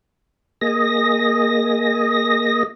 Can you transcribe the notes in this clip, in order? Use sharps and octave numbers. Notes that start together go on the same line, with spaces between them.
A#3 G#4 D#5 A#6